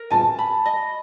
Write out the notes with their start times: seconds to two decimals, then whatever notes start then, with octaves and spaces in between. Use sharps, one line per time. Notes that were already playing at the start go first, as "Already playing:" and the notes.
Already playing: A#4
0.10 G#5 A5
0.39 B5
0.66 D#5